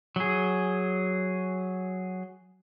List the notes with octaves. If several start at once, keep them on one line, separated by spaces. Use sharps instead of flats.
F#3 G#4